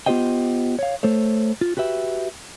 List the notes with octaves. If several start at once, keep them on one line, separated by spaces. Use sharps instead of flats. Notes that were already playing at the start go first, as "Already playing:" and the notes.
B3 F4 G4 C5 D#5 G5
C#5 F5
A3 A4 C5 C#5
F4
F#4 G4 B4 E5